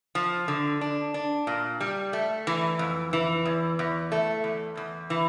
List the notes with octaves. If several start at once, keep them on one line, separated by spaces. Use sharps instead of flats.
F3
D3
D4
D4
A#2
G3
A3
E3
F2
E3
E2
E2
A3
E2
E2
E3